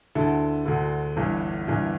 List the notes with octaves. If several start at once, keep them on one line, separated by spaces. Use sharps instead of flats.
D2 D3 E4 A4
D2 D3
G1 G2 E3
G1 G2 E3